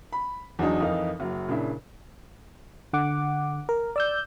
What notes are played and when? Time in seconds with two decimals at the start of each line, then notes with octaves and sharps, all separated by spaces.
0.13 B5
0.59 E2 F#3 D4 D#4
0.80 F2 E3 D#4 A#4 F5
1.20 F#1 F#3
1.48 A#2 C#3 D4 E4
2.93 D3 F#5 D6
3.69 A#4
3.96 D5 E6 G6